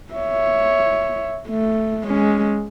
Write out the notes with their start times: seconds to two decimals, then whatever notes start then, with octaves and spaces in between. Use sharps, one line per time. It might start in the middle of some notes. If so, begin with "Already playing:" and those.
0.14 C#5 E5
1.48 A3
2.05 G#3 C#4